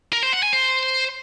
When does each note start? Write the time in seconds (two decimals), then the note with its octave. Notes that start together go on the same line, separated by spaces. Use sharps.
0.13 A#4
0.23 C5
0.33 F#5
0.43 G#5
0.53 C5